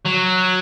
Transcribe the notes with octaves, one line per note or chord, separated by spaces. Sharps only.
F#3